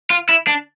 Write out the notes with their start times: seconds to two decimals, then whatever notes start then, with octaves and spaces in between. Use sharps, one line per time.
0.10 F4
0.29 E4
0.47 D4